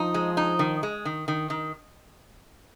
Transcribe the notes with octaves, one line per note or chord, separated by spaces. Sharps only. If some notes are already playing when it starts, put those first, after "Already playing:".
Already playing: F3 D#4
G#3
D#4
D#3
G#3
D#3
D#3
D#3